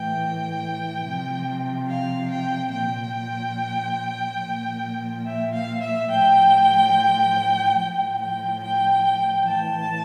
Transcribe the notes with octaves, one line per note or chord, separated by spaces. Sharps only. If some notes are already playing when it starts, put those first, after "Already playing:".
Already playing: A2 E3 G5
C3 F3
F5
G5
A#2 F3 G5
A#2 F3
E5
F5
E5
A2 F3 G5
A2 F3 G5
G5
G5
A2 E3 A5